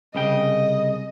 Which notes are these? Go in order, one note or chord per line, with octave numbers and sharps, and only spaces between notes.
C2 C#3 D#5 G5